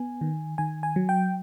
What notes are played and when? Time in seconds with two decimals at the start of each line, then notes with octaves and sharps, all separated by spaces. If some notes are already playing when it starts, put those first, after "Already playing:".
Already playing: B3 G#5
0.21 D#3
0.58 D#3 G#5
0.83 G#5
0.96 F#3
1.09 G5